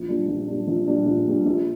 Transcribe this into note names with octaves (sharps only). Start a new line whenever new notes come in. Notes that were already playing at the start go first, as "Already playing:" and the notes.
Already playing: A#1
A#2 G3 D4
A#1
A#2 G3 D4
A#1
A#2 G3 D4
A#1
A#2 G3 D4
A#1